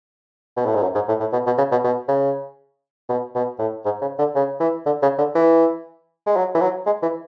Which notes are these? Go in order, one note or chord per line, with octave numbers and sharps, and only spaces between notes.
B2
A2
G#2
F#2
G#2
A2
A2
B2
B2
C#3
B2
B2
C#3
B2
B2
A2
G#2
C#3
D3
C#3
E3
D3
C#3
D3
E3
G#3
F#3
E3
F#3
G#3
E3